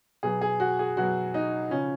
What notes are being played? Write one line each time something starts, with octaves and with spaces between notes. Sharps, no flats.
B2 F#3 G#4
G#4
F#4
G#4
B2 F#3 F#4
D#4
C#3 F3 C#4